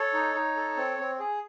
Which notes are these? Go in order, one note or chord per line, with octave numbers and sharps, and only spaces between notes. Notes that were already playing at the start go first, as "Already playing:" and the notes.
Already playing: A4 C#5
D#4
D#4
A4
C4
C4
G#4